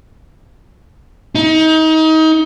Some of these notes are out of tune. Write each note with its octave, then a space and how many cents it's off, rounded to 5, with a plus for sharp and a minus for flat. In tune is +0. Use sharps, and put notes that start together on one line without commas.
D#4 +30